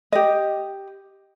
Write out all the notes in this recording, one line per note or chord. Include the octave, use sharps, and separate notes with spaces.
G4 D#5